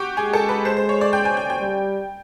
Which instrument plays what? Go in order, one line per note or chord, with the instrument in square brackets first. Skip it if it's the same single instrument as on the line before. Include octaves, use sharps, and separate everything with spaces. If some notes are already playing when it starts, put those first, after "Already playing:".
Already playing: [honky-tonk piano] F#4 G4
[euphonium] G#3 [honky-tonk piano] G#4
[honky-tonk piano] A4
B4
C5
C5
C#5
D5
G5
G#5
G5
G5
[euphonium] G3